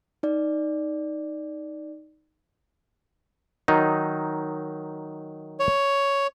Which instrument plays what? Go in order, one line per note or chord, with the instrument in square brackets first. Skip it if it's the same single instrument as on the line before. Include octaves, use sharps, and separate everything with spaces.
[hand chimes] D#4 D5
[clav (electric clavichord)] D#3 F#3 D#4
[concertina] C#5